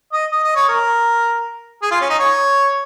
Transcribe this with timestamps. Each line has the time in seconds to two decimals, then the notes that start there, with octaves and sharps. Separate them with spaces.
0.13 D#5
0.32 D#5
0.44 D#5
0.56 C#5
0.69 A#4
1.82 G#4
1.91 F4
2.01 C#4
2.10 D#4
2.19 C#5